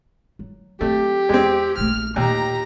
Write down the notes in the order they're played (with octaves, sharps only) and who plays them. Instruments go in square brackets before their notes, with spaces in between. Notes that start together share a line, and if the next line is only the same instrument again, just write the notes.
[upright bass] F#3
[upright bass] F#3 C4 [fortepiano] A3 [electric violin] G4
[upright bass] E2 [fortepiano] G#3 C4
[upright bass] A#1 A3 [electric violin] F6
[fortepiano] D#2 [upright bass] A#2 [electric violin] G4 A#5